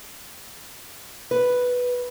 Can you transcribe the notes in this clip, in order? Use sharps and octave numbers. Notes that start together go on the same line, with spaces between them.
B4